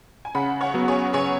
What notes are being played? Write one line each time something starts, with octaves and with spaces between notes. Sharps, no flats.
G#5
C#3 F#5 B5
C#5 F#5
F#3 B3 F#4
G#4 C#5
C#3 G#4 C#5